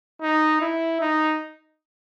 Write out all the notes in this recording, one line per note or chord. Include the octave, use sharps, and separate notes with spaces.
D#4
E4
D#4